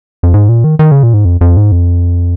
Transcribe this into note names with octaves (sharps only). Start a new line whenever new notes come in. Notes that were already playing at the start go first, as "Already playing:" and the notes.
F2
G#2
A#2
D#3
D#3
C#3
A#2
G#2
F2
F2
G#2
F2